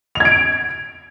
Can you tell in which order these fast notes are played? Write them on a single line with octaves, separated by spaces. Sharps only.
F7 G#6 D7